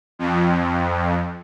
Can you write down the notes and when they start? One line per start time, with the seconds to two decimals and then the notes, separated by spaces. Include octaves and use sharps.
0.19 F2